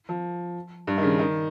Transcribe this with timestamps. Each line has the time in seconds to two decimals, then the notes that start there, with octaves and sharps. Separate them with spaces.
0.09 F3
0.87 G2
0.98 D#3
1.03 C#3
1.19 D#3